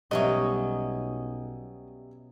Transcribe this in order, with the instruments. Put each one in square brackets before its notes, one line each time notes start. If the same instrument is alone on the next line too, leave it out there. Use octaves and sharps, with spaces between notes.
[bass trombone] B1 [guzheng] B2 F#3 C#4 [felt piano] G3 E5 [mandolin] D#5